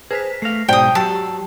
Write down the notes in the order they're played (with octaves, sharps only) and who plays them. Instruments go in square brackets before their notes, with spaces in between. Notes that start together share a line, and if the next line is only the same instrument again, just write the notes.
[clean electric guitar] G#4 [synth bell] B4 C5 B6
[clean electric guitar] A3 F5 [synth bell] A#6 C7
[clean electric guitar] B1 G#2 F#3 [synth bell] C5 D5 A5 [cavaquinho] G5 D#6
[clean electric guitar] F#3 [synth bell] G4 G5 E6 [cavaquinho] A5